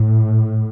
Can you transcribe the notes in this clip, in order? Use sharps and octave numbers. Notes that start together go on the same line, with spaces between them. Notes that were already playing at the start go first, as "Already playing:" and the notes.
Already playing: A2